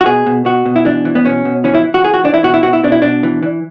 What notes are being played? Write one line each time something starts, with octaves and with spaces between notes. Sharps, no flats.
F#4
B2 G#4
B2
B2 F#4
B2
E4
E3 D4
E3
B3
B2 C#4
B2
E3 C#4
E4
E3
F#4
E3 G#4
F#4
E3 D4
E4
B2 F#4
E4
B2 F#4
E4
B2 D4
E4
B2 D4
E3
E3